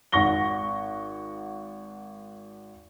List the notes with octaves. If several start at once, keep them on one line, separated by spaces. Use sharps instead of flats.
G#1 F#5 C#6 A#6 G7